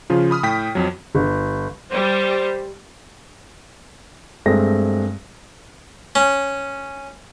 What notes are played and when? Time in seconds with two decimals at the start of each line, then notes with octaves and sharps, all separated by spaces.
0.10 C#3 F3 F4
0.31 B5 D#6 F6
0.43 A2 G5 D#6 B6
0.75 F2 F#3
1.15 G1
1.91 G3 C5
4.46 G2 G#3 A3 C4 A#6
6.15 C#4